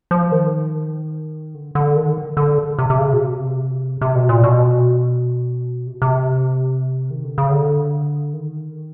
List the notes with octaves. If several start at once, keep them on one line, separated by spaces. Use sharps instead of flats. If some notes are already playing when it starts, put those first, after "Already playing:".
F3
D#3
D3
D3
D#3
D3
C3
C3
C#3
B2
C3
C3
B2
A#2
B2
C3
B2
C3
D#3
D3
C#3
D3
D#3